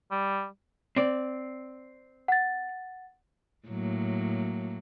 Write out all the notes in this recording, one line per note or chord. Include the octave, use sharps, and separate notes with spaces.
G3
C4 D5
F#5 A6
A2 F#3 A#3